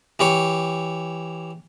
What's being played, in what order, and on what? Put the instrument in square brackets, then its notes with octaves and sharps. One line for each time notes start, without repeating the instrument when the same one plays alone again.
[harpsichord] E3 G4 C#5